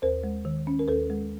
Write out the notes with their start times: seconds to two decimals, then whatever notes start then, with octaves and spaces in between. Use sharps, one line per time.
0.02 D#2 A#4 C5
0.24 G#3
0.45 D#3
0.67 C#4
0.79 A#4
0.88 D#2 A4 B4
1.10 G#3